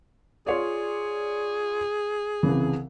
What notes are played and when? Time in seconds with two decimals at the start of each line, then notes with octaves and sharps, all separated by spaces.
0.46 F4 G#4 C#5 D5
2.43 C2 C#3 E3